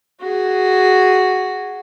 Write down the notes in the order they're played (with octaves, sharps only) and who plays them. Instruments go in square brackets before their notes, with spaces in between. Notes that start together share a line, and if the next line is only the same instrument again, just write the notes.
[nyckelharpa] F#4 G#4